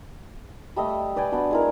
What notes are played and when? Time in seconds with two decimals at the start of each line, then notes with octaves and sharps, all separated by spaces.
0.76 G3 A3 D#5 E6
1.16 B4 D5 G5 G#5
1.32 B3 D4 F#4
1.51 G#3 E4 A#4